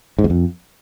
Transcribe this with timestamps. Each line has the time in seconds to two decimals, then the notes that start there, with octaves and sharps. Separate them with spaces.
0.19 G#2
0.24 E2
0.30 F2